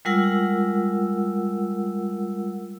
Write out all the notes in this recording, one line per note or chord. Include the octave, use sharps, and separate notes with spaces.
G3 G#3 F4 A#4 F#5 E6